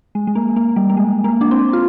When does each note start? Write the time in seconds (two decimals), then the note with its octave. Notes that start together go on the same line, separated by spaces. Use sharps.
0.15 G#3
0.27 G#3
0.35 A#3
0.56 A#3
0.76 G3
0.90 A#3
0.97 G#3
1.24 A#3
1.41 D4
1.51 C4
1.73 F4